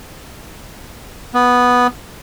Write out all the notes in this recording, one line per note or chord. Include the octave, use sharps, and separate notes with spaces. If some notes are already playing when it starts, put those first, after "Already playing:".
B3